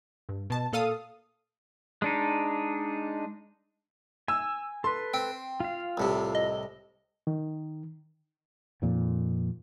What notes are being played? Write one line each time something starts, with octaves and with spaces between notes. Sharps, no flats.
G2
B2 A5
A#2 A4 F5 D#6
G#3 D4 D#4
G#5 E6
A4 B4 C6
C4 G5
F4 F5
C2 A2 C3
D#5
D#3
F2 A#2 D#3